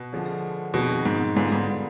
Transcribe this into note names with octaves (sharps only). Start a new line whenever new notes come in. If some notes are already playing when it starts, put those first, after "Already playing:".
Already playing: B2
D3 F3 G#3
F2 B2 D#3 G#3
G#2
G#2 D3 G3 B3 F4 G#4
G#2